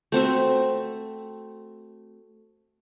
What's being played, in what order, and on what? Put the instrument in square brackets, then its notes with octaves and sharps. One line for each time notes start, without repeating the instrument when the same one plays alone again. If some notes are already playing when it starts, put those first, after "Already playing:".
[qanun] A3 C4 F#4 E5